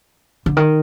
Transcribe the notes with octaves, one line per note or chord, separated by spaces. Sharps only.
D3
D#3